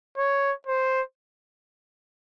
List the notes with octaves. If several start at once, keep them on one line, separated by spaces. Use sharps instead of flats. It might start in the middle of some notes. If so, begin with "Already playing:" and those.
C#5
C5